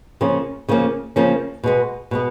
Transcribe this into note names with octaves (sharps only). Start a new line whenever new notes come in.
C#3 F3 A#3 C#4
C#3 F3 A#3 C#4
C#3 F3 A#3 C#4
B2 G#3 B3
B2 G#3 B3